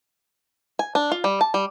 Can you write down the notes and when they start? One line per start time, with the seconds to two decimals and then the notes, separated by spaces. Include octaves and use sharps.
0.79 G#5
0.95 D4
1.12 F4
1.24 G3
1.41 A5
1.54 G3